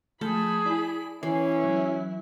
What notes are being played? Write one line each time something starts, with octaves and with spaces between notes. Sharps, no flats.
F3 A3 G#4 A4 B5 G6
E4 D5
E3 C#4 E4 B4 C7
F#3